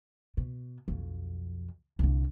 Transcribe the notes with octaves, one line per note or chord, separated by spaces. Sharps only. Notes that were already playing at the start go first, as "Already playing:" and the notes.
B2
B1 F2
C2 D3